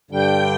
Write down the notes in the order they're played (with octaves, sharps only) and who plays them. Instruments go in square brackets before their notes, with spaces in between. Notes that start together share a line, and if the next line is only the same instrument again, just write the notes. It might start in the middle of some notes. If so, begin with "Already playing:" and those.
[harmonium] G2 D3 G3 D4 [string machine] G5